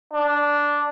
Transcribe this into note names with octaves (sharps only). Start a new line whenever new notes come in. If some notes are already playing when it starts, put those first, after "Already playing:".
D4